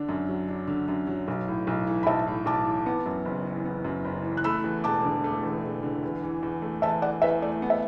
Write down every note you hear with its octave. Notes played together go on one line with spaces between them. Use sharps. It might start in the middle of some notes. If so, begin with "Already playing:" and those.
Already playing: D3 D4
F#2
F#3
D4
D3
F#2
F#3
B1
A2
B1
E3
B5
B1 E5 A5
A2
B1 A5 D6
E3
B3
F#2
F#1
E3
B3
F#2
F#1
E3
F#6
A3 B5 E6
E2
E1 A5 D6
D3
A3
E2
E1
D3
E2
E3
E2
A3
E2 E5 A5
E3 D5 F#5
E2 B4 E5
A3 D5
B3
E5